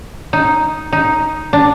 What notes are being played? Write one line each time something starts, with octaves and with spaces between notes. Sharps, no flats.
D#4
D#4
D4